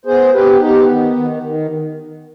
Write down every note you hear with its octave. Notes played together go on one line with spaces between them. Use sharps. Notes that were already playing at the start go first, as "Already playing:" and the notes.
B3 G#4 C5
B3 G4 B4
B3 D#4 G4
D#3
D#3
D#3